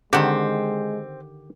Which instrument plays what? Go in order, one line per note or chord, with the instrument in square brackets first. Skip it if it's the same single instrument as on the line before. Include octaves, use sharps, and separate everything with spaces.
[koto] D3 D#3 [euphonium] G#3 [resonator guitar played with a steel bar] C4 [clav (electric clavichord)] G4 F#5